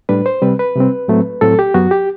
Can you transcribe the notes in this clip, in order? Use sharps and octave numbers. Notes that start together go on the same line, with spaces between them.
A2 G3 D4 B4
C5
C3 G3 C4 B4
B4
C3 G3 C4
A2 F#3 A3 C4
A2 F#3 A3 C4 A4
G4
F#2 F#3 B3 F#4
G4